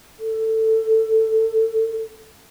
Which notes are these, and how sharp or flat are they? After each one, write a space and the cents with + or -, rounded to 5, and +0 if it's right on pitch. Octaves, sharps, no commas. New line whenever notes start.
A4 +10